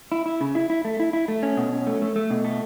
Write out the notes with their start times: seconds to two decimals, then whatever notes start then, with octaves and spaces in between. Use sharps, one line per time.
0.12 E4
0.26 E4
0.41 C#3
0.55 E4
0.70 E4
0.85 A3
1.00 E4
1.13 E4
1.28 A3
1.43 C#4
1.57 B2
1.73 C#4
1.87 A3
2.02 A3
2.16 A3
2.30 B2
2.45 A3